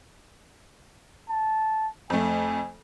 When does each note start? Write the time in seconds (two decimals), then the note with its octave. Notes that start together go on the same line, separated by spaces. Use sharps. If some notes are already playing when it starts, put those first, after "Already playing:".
1.29 A5
2.10 F2 A3 G#5